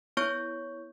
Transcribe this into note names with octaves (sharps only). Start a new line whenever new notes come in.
B3 E4 C#5 C#6 G6